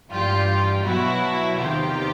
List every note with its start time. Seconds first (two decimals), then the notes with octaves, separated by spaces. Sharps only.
0.11 G2 E3 G3 F4 G4
0.84 B2 F#3 E4 F#4
1.57 E2 C3 D#3 F4 G4